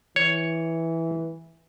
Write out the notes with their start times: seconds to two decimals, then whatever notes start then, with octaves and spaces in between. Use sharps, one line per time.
0.16 E3 C#5